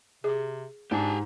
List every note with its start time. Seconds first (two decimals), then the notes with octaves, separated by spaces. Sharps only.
0.24 C3 G#4
0.91 G#2 D4 G4 G#5